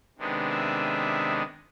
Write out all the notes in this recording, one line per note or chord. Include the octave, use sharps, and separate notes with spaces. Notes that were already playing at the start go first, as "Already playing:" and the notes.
C3 D#3 G#3 B3 D4
E5